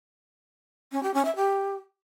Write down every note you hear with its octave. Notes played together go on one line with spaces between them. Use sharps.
C#4
G4
C#4
E5
G4